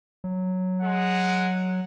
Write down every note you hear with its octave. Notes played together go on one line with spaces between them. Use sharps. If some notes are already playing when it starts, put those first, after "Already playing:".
F#3
G#3 F#5